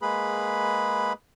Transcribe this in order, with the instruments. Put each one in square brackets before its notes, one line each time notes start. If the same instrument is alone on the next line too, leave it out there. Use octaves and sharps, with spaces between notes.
[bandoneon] G#3 A#3 G#4 B4 B5